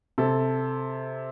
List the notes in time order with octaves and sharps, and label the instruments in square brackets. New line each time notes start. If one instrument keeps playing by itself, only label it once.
[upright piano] C3 A4